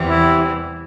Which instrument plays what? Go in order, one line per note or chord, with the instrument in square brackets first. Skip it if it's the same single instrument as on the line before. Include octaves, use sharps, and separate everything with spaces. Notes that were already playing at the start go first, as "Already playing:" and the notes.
Already playing: [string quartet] E2 C3 E3 G3
[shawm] E4